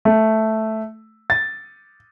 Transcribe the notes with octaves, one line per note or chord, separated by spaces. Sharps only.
A3
A6